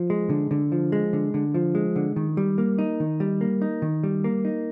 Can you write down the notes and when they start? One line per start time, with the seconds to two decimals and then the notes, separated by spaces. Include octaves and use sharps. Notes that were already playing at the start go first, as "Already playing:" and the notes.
Already playing: F3
0.10 G#3
0.30 D3
0.51 D3
0.72 F3
0.92 G#3
1.13 D3
1.34 D3
1.54 F3
1.75 G#3
1.96 D3
2.16 D#3
2.37 G3
2.58 A#3
2.79 D#4
3.00 D#3
3.20 G3
3.41 A#3
3.62 D#4
3.82 D#3
4.03 G3
4.24 A#3
4.45 D#4